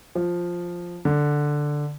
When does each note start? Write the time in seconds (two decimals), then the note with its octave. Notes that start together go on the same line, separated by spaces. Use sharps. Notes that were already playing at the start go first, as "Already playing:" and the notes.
0.15 F3
1.05 D3